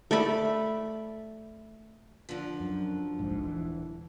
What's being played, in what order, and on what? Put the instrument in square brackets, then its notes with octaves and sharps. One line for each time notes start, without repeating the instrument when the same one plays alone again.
[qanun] A3 D5 B5
[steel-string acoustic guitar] D3 F3
[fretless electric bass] F#2
D1 A#1 G#2
D#1 E3